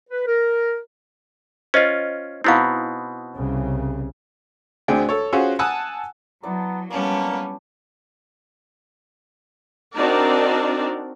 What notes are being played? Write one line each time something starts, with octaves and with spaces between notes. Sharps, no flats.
B4
A#4
C#4 F4 C5 D#5
B2 B3 C4 D#4 E4 F5
C2 C#3
D2 C4 D4 G#4 G5
A4 C#5
C#4 F4 F#4 G#4 C5
F#5 G#5 A5 D#6 E6 F#6
F#3 B3 E4 D5 A5 A#5
G3 A#3 B3 C#4 D4 A5
C4 D4 D#4 F#4 A#4 D5